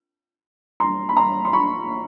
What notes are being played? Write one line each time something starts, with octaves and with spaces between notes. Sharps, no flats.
A#5 C6
B5
A#5 C6
C6
B5 C#6